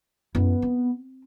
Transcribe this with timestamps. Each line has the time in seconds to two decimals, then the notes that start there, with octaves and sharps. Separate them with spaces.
0.35 F#2 B3 E4
0.62 C4